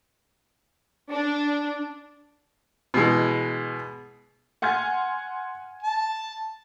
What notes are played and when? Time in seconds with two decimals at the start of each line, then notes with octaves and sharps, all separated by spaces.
1.11 D4
2.94 B2 E3 G#3
4.62 F#5 G#5 C6 F6 G#6
5.83 A5